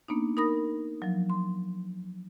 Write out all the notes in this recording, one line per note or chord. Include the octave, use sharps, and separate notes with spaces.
A#3 B3 D4 D#4
D#4 A#4 B5 D#6 A#6
F3 F#3
C6